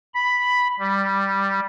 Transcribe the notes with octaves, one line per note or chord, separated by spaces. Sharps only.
B5
G3